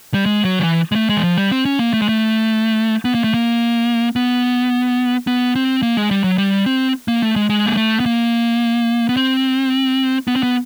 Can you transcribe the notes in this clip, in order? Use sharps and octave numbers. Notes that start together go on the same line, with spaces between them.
G3
G#3
F#3
D#3
E3
G#3
A3
G#3
E3
F3
G3
C4
C#4
A#3
A3
G#3
A3
B3
A#3
A3
A#3
B3
B3
C4
A#3
G#3
G3
F#3
G3
C4
A#3
A3
G#3
G#3
A#3
A3
B3
A#3
B3
C4
B3
C4
B3